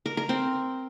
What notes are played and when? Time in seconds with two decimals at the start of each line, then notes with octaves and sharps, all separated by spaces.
0.06 A#4
0.17 A#4
0.29 C4